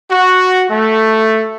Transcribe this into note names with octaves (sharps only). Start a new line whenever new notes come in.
F#4
A3